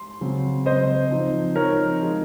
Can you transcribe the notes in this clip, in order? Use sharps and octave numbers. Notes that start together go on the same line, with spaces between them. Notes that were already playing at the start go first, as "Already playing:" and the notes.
Already playing: C6
C#3 F#3 C4
C#3 F#3 C4 C5 D#5
F3 C4 D#4
F3 C4 D#4 A#4 C#5
F3 G#3 D#4